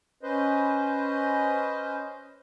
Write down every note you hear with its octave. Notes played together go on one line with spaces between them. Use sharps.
C#4 B4 C5 D#5